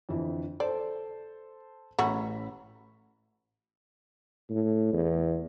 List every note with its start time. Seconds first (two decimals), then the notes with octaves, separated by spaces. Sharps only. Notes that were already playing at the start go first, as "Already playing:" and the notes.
0.09 F2 D3 E3
0.60 A4 C5 D5 A5
1.99 A1 A3 C#4 F#4 A#5 B5
4.50 A2
4.93 E2